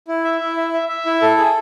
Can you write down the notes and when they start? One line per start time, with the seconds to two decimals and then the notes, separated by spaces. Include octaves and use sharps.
0.08 E4
0.24 E5
0.41 E4
0.57 E5
0.73 E5
0.89 E5
1.06 E4
1.22 A4
1.38 G#4